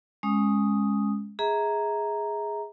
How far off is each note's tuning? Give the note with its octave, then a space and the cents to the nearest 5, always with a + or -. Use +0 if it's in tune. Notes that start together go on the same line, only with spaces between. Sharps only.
G#3 +0 C#4 -5 D#6 +0
G#4 +0 E5 -35 A#5 +0